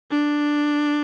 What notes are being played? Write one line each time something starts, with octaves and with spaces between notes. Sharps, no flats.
D4